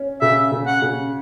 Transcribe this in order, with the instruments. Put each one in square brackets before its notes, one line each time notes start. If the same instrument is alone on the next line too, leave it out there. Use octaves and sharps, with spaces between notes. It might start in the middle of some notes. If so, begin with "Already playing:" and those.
Already playing: [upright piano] C#4
[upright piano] C#3 [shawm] E5
[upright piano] C#3
[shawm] F#5
[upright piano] C#3